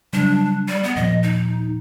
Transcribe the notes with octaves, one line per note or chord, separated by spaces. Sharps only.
C#3 F#3 G3 D4
G3
B3
D#1 A#2 F3 D#5
D#4